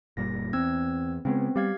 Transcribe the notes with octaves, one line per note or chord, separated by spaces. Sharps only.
F#1 A#2 G3 A#6
E2 C4 E6 G#6
C#3 G#3 B3 C4
G3 G4 F5 G#6